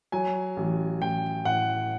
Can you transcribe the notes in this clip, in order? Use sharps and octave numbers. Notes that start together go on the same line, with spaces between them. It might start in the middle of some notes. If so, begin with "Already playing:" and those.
F#3 G#5
A1
A1 G5
A2 F#5